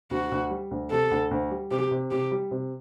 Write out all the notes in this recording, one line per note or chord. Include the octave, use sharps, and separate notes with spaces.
D2 F#4
D2
G3
D2
C3 A4
D2
D2
G3
C3 G4
C3
C3 G4
G3
C3